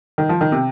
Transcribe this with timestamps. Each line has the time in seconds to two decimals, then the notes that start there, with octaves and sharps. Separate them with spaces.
0.18 D#3
0.29 F3
0.41 D#3
0.52 C3